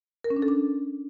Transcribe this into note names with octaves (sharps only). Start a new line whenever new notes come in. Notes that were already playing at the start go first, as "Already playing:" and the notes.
A#4
C#4
D4
A4
D4